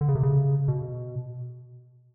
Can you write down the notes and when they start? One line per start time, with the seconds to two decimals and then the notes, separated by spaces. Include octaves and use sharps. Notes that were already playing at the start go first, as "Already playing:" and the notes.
0.01 D3
0.08 C#3
0.15 C3
0.23 C#3
0.68 B2